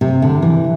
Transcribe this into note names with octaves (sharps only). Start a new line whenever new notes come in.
C3
D3
E3